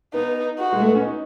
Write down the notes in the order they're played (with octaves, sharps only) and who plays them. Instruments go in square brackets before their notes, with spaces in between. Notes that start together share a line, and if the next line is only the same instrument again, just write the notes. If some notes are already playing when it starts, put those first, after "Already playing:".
[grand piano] B3 [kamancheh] D#4
[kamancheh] F#4
[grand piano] G#3
A3
B3
C#4
D#4